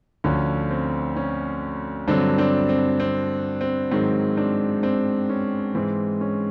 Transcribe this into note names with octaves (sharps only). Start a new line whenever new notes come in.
D2 D3 F3 C#4
C4
C#4
G2 D3 F#3 C4 D4
C4 D4
C4
C4
C4
G#2 D#3 F#3 C4
C4 D4
C4 D4
C#4
G#2 E3 C4
C#4